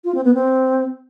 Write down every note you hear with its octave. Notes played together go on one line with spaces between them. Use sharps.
F4
C4
B3
C4